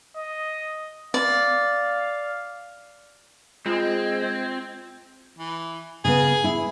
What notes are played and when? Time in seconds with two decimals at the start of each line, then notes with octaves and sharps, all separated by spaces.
0.17 D#5
1.14 D5 F5
3.66 G#3 C4 F4 C5 D#5 G#6
5.39 E3
6.05 C#3 B3 G#4
6.44 E4